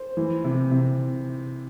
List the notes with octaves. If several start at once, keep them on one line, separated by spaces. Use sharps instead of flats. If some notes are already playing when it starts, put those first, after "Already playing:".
Already playing: C5
E3
C3
C3